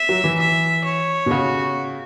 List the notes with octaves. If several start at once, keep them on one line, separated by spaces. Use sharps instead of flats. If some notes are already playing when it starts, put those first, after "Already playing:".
Already playing: E5
F#3
E3
E5
C#5
B2
C#3 F#4